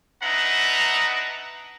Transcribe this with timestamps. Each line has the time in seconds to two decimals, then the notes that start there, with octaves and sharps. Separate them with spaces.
0.23 D4 D#4 B4 E5 F#5 A#5